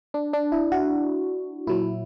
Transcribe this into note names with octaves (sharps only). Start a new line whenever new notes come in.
D4
D4
E4
F#4
A#2 F#3 E4